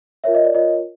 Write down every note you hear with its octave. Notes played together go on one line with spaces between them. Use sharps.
F4 A#4 C#5 E5
D#5
D5
F4 A#4 C#5 D#5